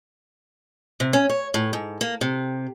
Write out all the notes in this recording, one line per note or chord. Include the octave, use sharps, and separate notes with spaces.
C3
C#4
C#5
A2
G#2
A#3
C3